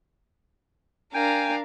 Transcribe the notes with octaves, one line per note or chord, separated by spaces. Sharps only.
D4 A#4 F5 G5 G#5